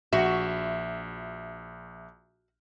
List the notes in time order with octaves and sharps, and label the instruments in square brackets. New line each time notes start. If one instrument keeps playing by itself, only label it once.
[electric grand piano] A#1 E5 [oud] F#4